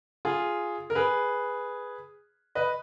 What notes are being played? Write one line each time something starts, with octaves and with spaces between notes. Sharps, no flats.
F4 G#4
A#4
G#4 B4
B4 D#5